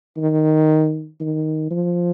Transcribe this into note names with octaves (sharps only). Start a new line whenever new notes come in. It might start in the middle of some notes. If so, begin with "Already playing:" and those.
D#3
D#3
F3